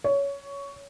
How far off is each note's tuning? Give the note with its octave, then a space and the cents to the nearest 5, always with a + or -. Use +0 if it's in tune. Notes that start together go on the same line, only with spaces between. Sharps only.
C#5 +15